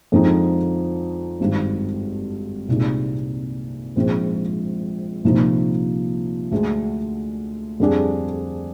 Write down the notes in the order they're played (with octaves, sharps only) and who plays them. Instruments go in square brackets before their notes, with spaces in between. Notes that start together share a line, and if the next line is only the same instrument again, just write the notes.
[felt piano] F2 D3 F3 G#3 D#4
G#1 G2 D#3
C2 A#2 G#3 D#4
A#1 G#2 F3 G#3 C4
C2 A#2 F3 A#3 D#4
D2 D3 G#3
F2 D3 G3 D4 G#4